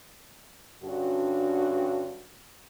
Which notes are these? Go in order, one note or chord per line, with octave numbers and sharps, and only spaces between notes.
G2 D3 C#4 F#4